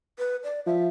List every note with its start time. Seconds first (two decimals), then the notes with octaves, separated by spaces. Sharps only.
0.19 B4
0.43 D5
0.66 F3 E5